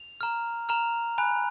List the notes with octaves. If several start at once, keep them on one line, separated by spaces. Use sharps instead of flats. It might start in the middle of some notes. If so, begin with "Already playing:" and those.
Already playing: F7
A#5 F6
A#5 F6 F7
G#5 B5 F#6